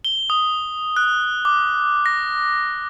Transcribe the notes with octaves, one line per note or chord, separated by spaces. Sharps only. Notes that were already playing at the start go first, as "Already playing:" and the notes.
G7
D#6
F#6
D6
A#6